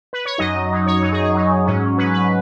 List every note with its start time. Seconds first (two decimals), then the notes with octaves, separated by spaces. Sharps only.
0.13 B4
0.25 C#5
0.38 F#2 F#3 D#4 D#5
0.70 F#2 F#3 D#4
0.86 C#5
1.03 F#2 F#3 D#4
1.12 G#4
1.23 G#4
1.34 F#2 F#3 D#4
1.66 G#2 F#3 C#4
1.98 G#2 F#3 C#4 B4
2.14 B4